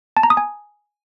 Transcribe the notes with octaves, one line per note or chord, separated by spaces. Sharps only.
A5
A#5
D#6
G#5